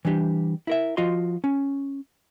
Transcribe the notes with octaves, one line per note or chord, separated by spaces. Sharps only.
E3 G3 D4 G4
E4 A#4 E5
F3 F4 F#4 D#5 C6
C#4